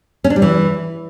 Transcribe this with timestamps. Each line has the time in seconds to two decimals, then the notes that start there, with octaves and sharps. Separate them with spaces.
0.24 C#4
0.30 D4
0.36 G3
0.42 E3